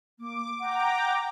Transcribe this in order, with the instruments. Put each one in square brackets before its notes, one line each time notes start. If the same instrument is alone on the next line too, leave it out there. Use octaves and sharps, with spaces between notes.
[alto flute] A#3 [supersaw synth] D6
[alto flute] F#5 [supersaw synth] G5 A#5 D6